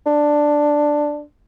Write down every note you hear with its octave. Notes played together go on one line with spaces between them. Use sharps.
D4